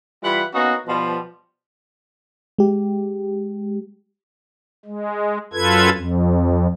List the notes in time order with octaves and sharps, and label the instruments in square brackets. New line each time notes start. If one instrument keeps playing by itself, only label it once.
[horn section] E3 G3 F4 F#5 B5
A#3 B3 C#4 D#4 F#4
B2 F3 G3
[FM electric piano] G#3 G4
[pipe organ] G#3
F#2 F4 A4 B4 G#6
F2